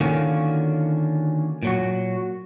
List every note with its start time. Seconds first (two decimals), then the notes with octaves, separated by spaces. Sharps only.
0.01 D3 D#3 A#3 C#4 F4 F#4
1.63 A#2 F#3 F#4